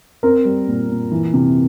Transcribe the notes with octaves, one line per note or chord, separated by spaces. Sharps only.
C4 A#4
G3
A#2
A#2
E3
C3